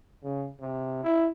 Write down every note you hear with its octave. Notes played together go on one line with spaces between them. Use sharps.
C#3
C3
E4